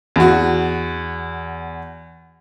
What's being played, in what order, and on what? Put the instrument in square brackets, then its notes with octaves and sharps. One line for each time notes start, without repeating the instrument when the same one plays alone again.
[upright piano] E2 F#4